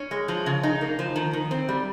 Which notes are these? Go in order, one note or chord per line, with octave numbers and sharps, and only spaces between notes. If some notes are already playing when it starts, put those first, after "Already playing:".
Already playing: C#4
G#3
F3
C#3
D#4
A#3
F3
D#3
D#3
C4
G3